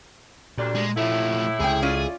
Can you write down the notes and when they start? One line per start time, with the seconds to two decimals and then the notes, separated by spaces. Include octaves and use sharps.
0.58 D2 A#2 G3 D4
0.75 G#3
0.97 A2 F3 A3 E4
1.60 C#2 C3 G#4 G5
1.82 C#4 F4 D5